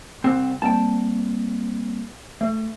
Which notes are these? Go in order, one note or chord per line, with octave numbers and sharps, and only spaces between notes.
C2 C4
G3 A#3 C4 G5 A5
A3